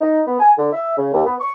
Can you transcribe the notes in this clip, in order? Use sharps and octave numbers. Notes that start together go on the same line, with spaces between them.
D#4
B3
G#5
D3
E5
C#3
D#2
B3
C#6